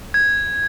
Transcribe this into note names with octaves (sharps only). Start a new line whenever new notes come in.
G#6